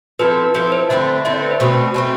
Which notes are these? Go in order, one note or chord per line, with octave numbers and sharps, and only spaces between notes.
F3 C4 E4 A4 B4
F3 C4 E4 A4 B4
C5
D3 A3 C4 E4 E5
D3 A3 C4 E4 E5
D5
B4
C5
B2 A3 C4
B2 A3 C4